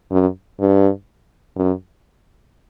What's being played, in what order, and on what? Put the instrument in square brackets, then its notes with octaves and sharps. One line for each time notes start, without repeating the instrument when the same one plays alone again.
[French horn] F#2
G2
F#2